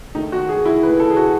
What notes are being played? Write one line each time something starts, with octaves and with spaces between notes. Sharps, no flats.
D#3 A3 D#4
F#4
G#4
E4
D#3 A3 B4
A4
G#4
F#4